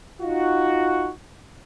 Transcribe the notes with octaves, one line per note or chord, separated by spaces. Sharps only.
D#4 F4 F#4